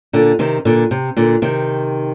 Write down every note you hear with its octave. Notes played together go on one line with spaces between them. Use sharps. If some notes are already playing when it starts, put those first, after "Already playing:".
A#2 D3
C3 D#3
A#2 D3
C3
A#2 D3
C3 D#3